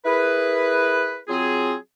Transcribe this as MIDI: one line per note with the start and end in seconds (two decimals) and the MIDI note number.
0.06 1.18 64
0.06 1.18 68
0.06 1.18 70
0.06 1.18 71
1.28 1.75 54
1.28 1.75 60
1.28 1.75 65
1.28 1.75 68